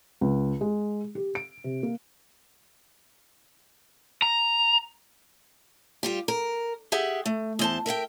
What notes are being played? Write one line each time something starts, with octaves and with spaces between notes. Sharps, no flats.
C#2
G#3
G4
D7
C3
A#3
A#5
G3 F4 G4
A#4
G4 G#4 E5 F#5
A3
E2 C5 A5
A#4 E5 F#5 G5